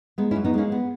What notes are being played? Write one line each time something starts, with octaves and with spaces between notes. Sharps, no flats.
G#3 B3 D#4
C#4 E4
F#2
B3 D#4
G#3 A#3 C#4
B3